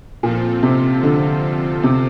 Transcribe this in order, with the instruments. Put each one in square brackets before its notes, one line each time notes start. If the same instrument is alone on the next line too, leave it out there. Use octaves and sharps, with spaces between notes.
[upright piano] A#2 [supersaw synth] F3 C4 F4 A4
[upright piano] C3
D3
C3